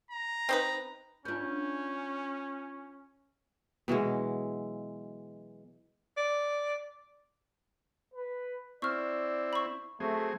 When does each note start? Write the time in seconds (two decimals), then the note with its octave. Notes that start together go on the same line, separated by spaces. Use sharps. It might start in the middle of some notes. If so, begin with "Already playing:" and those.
0.11 A#5
0.49 C4 D#4 B4
1.25 B3 C#4 D4 F4 G6
3.88 B2 E3 F#3 G#3
6.17 D5
8.14 B4
8.82 C4 E4 D5 C#6 F6
9.53 B5 C#6
10.00 F#3 A3 C4 G#4